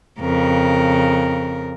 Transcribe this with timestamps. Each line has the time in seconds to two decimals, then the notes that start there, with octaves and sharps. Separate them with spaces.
0.21 F2 C#3 A#4